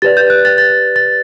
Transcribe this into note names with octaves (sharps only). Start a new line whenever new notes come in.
G4 B4 D5 A6
G6
F#6
A6
A6
A6